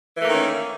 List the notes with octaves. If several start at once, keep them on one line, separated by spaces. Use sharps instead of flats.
D#3 E3 A3 A#3 C#4